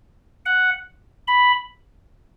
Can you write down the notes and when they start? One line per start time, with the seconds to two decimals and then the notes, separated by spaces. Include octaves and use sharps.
0.46 F#5
1.28 B5